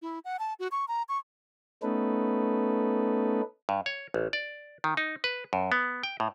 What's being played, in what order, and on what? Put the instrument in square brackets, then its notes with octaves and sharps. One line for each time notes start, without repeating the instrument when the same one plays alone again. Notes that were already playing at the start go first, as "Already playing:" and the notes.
[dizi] E4
F#5
A5
F#4
C#6
A#5
C#6
[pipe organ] A3 B3 C#4 D#4 A4 B4
[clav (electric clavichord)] G2
C#5
A1
D5
D#3
D#4
B4
F#2
B3
G5
A2